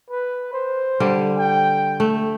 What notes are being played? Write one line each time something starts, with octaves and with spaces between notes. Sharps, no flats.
B4
C5
D3 G3
G5
A3